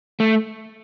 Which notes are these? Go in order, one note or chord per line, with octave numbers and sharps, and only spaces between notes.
A3